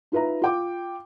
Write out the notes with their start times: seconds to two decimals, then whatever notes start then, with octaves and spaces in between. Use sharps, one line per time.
0.12 D#4 F4 B4 E5 A#5
0.42 F4 G5 D6